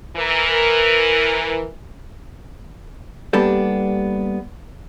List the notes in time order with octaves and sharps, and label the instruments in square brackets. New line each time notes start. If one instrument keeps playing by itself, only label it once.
[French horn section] E3 A#4
[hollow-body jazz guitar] G3 A#3 B3 D4 G4 A4